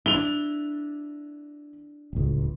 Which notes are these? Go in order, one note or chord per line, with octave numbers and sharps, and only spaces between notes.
D4 E4 F7 G7
D1 C#2